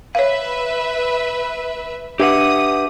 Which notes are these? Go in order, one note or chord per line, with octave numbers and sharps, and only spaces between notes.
B4 C#5 E5 F5
D4 G4 B4 E5 F#5 D6 D#6